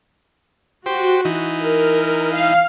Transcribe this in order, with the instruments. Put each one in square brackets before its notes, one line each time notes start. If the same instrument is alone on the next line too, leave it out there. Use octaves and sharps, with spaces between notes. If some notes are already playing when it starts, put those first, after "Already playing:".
[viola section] F#4 [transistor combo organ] G4 C5
[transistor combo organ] E3 D#4
[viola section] A#4
F5